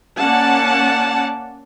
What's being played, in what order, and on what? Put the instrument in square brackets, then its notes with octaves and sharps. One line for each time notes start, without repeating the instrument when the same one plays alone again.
[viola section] A#3 C#4 D5 F#5 A5